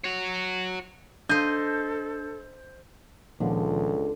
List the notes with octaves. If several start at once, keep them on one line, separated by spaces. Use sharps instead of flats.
F#4 C#5
D4 A4 C5 D#5 G6
C#2 A#2 D3 D#3 F3